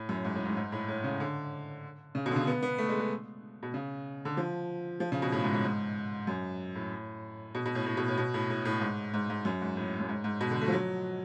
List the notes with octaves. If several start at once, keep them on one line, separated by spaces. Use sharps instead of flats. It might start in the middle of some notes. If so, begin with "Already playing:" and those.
Already playing: A2
F#2
G#2
A2
G#2
G#2
A2
A2
C#3
D3
C#3
B2
D3
C#3
B3
B3
A3
G#3
G#3
B2
C#3
D3
F3
F3
C#3
B2
A2
G#2
G#2
G#2
F#2
A2
B2
B2
A2
A2
B2
A2
B2
A2
A2
A2
G#2
G#2
G#2
F#2
G#2
A2
F#2
G#2
G#2
B2
D3
A3
F3
F#3